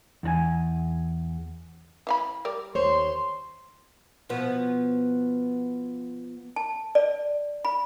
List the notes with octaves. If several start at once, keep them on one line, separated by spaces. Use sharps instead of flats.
E2 D4 G#5
E3 F5 B5
G3 A#4 D5
D#2 C5 C#5 C6
B2 F3 B3
A5
D5
B5